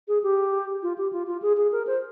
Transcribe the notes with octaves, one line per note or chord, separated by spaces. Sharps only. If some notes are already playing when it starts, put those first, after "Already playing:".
G#4
G4
F4
G4
F4
F4
G#4
G#4
A#4
C5